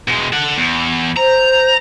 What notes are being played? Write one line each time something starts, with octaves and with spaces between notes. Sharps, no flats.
B2 G#3
A4 F#5
E2
C5 A#5